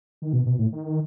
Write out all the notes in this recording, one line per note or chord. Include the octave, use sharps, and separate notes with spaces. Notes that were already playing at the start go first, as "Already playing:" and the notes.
D#3
B2
B2
A2
D#3
D#3